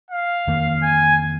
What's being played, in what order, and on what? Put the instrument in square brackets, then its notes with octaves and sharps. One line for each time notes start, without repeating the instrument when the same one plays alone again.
[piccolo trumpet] F5
[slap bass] F2 D#3 A#3
[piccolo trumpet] G#5